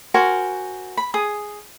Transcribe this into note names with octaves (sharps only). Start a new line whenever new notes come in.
F#4 A#4 C5 G#5
B5
G#4 D#6